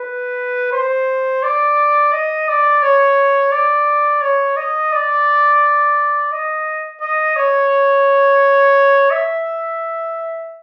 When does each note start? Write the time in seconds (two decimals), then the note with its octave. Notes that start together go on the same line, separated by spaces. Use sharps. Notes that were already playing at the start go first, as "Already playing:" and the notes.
Already playing: B4
0.73 C5
1.43 D5
2.12 D#5
2.48 D5
2.82 C#5
3.52 D5
4.22 C#5
4.56 D#5
4.92 D5
6.32 D#5
7.01 D#5
7.36 C#5
9.11 E5